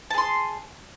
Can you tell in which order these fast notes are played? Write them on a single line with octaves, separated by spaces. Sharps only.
A5 G#4 C6